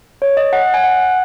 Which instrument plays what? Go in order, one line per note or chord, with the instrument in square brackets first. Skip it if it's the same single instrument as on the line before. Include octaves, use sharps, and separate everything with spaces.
[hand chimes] C#5
D#5
F#5
G#5
F#5